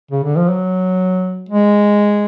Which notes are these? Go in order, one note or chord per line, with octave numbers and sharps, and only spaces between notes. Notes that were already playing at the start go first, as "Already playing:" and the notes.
C#3
D3
F3
F#3
G#3